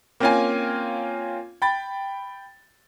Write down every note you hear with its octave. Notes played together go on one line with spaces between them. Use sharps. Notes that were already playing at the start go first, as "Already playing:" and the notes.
A#3 C4 C#4 F4 F5 G#5
G5 B5 A6